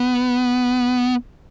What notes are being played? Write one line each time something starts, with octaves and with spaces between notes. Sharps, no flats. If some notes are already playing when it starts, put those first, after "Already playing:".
Already playing: B3